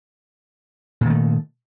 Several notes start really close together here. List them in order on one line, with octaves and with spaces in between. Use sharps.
A#2 D#3 A3